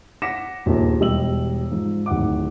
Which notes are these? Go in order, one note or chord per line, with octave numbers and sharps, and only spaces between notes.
F#5 D6 A#6 B6 C#7 E7
A#1 D#2 A#3
E1 G3 G4 D#5 E6 F#7
G#2 F3
D1 D#3 F#5 D6